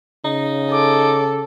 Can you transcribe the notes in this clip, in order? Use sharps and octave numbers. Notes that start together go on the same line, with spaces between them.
C#3 D#4
A4 D6